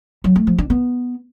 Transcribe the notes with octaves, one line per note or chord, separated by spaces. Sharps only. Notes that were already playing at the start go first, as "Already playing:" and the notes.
F#3
A3
F3
D4
B3